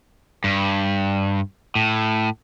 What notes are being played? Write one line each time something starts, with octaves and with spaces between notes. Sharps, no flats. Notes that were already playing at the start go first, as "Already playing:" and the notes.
G2
A2